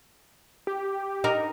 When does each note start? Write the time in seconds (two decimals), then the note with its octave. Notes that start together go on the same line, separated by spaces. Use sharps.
0.67 G4
1.24 D#4 A#4